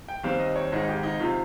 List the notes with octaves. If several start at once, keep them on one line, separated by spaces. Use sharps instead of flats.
G5
D#2 D#3 G3 C4 F5
D#5
C#5
G#1 G#2 D#3 D#4
G4
D#4
C3 D#3 F4